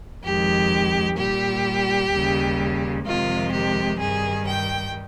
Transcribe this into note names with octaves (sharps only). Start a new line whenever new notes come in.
F2 D#3 G#3 G4
A#2 G3 G4
D#2 C#3 G3
F2 C3 D#3 G#3 F4
G4
G2 D#3 G3 G#4
G5